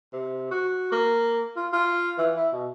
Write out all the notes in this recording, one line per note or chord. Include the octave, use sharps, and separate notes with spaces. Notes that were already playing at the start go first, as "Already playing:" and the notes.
C3
F#4
A#3
F4
F4
E3
E4
B2